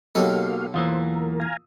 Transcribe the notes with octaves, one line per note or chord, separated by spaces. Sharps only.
B1 F#3 A#3 F#4 G4 A4 D#5 F5
E2 E3 A#3 F4 C5 D#6 E6
A#4
F5 G#5 A#5